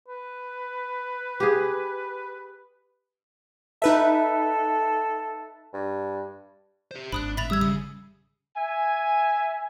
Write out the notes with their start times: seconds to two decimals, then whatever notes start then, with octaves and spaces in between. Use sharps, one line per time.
0.08 B4
1.40 G4 G#4
3.82 D#4 A4 B4 E5
5.74 G2
6.91 G4 C5
7.12 G#1 D4 B5 D#6 F#6
7.37 A2 E5 B5 A6 F7
7.50 E2 G3 D#6 E6 G#6
7.61 C#3 D#6
8.56 E5 G#5